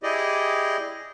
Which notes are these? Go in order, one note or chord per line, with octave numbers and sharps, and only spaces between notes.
E4 G4 G#4 D5 D#5